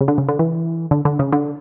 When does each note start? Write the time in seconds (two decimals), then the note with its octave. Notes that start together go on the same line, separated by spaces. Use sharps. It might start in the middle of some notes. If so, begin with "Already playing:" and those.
0.01 C#3
0.08 D3
0.18 C#3
0.29 D3
0.39 E3
0.91 D3
1.05 D3
1.19 C#3
1.32 D3